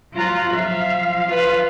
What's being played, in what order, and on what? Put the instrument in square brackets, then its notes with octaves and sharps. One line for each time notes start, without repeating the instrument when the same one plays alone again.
[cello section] F3 F#3 F4 [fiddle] A#5 F#6
[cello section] F3 F5 [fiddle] E5
[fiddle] F4 B4